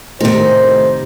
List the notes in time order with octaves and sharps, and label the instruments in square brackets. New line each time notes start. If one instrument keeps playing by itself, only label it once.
[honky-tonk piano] A2 D#3 [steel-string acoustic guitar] C3 D#4 [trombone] C5